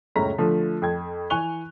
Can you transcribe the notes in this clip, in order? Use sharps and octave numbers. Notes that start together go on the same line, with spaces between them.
F#1 C#2 A2 C#4 A#5 B6
D3 F3 A3
F2 G5 G#6
E3 G#5 C#6 F#6 F7 G7